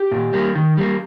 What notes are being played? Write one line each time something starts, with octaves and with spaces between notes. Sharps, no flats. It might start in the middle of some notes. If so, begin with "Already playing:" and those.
Already playing: G4
A#2
G3 A#3
D#3
G3 A#3